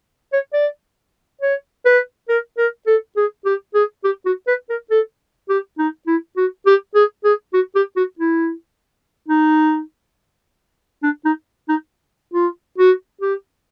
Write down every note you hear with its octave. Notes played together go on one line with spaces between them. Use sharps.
C#5
D5
C#5
B4
A#4
A#4
A4
G#4
G4
G#4
G4
F#4
B4
A#4
A4
G4
D#4
E4
F#4
G4
G#4
G#4
F#4
G4
F#4
E4
D#4
D4
D#4
D#4
F4
F#4
G4